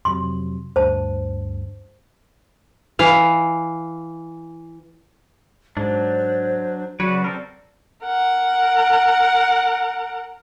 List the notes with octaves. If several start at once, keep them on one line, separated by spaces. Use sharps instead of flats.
F2 C3 F#3 C6
D2 G2 C5 A5
E3 F5
G#2 F#3 D4 C5
C#3 F#3 F#4 B4 D5
C4 A4 A#4
A#4 F#5